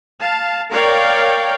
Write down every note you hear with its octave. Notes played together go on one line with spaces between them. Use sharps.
F5 A5
A#4 C#5 D5 F5 G5